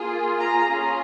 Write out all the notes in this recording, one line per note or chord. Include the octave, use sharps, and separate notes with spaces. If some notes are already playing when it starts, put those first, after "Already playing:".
Already playing: A#3 F4 G#4
A#5
C#4 F4 G#4